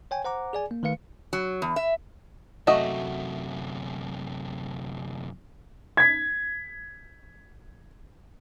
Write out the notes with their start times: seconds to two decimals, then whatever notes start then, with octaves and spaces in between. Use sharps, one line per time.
0.11 C#5 G5 G#5
0.24 C5 F#5 A#5 D6
0.53 G#4 D5 G#5
0.71 A#3
0.83 D#3 A3 B4 F5 C#7
1.33 F#3
1.62 E2
1.76 E5
2.67 F#2 C3 A3 F#4 D#5
5.97 G#6 B6